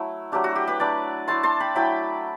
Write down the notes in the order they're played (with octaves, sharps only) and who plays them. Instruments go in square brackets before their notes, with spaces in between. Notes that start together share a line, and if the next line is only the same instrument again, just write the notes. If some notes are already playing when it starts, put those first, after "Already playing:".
Already playing: [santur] F#3 A3 E4
F#3 A3 D4 G4
F#4
G4
G4 B4
F#3 A3 D4 B4 D5
A3 E4 A5 C6
A5 C6
G5 B5
F#3 A3 E4 G5 B5